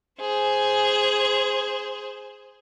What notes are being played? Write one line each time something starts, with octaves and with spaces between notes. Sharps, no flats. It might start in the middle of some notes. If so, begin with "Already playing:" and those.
G#4 C5